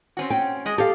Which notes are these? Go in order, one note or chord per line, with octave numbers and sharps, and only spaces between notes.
C4 C#4 F#4
G5
G#3 D#5
G4 A4 F5